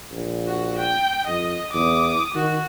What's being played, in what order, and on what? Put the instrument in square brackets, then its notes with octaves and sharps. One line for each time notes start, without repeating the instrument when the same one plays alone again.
[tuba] A#1
[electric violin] F#4
G5
[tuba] F2 [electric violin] D#5
[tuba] E2 [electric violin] D6 D#6
[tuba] D#3 [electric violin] F#4